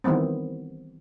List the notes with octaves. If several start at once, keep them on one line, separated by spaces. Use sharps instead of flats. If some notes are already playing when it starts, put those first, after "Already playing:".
D#3 E3 G3 B3 C4